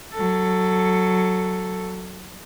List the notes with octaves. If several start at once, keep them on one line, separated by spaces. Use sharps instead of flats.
F#3 A4